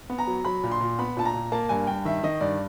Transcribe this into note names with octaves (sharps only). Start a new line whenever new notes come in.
B3
A#5
F#3
F#3 B5
A#2
C6
A#2
B3 B5
A#2 A5
A#5
A#2
A#3 A5
G2 G#5
G2 G5
D#3 E5
D#3 D#5
G2 D5